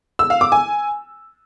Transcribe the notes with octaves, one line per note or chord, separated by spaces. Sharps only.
E6
F5
D6
G#5